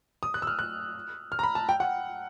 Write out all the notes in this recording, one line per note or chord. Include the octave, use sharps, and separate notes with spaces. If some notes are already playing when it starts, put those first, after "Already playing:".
D#6
F#6
E6
F6
F#6
F6
A#5
B5
A5
G5
F#5